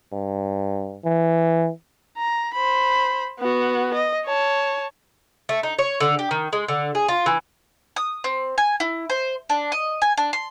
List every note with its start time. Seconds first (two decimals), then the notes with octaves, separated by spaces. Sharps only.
0.12 G2
1.04 E3
2.18 A#5
2.54 C5 B5
3.39 B3 F#4
3.94 D#5
4.26 C#5 A5
5.49 A3
5.63 D#4
5.79 C#5
6.00 D3
6.19 G4
6.31 D#3
6.53 G#3
6.68 D3
6.95 G#4
7.08 F4
7.26 E3
7.96 D#6
8.24 C4
8.58 G#5
8.80 E4
9.10 C5
9.49 D4
9.72 D#5
10.02 G#5
10.18 D4
10.33 C6